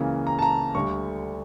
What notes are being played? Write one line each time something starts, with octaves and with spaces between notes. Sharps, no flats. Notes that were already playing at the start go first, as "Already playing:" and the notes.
Already playing: C#2 C#3 E3 A#3
A#5
A5
A#5
D2 D3 G3 C#6